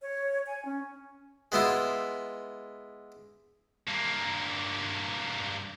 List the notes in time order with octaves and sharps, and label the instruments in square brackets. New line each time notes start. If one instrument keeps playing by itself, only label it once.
[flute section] C#5
G#5
C#4
[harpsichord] G#3 B3 E4 F4
[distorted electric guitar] G2 A#3